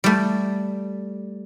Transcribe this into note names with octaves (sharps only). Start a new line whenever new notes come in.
G3 A3